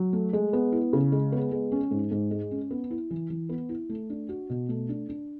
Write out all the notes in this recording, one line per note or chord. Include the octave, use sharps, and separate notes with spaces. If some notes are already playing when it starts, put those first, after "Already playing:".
Already playing: F#3
A3
G#3
B3
E4
C#3
G#3
B3
G#3
C#4
G#2
G#2
G#3
C#4
B3
E4
E3
E3
B3
E4
A3
D4
F#4
B2
A3
D4
D4